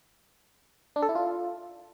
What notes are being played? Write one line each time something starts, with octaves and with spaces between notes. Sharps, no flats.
D4
A4
E4
F4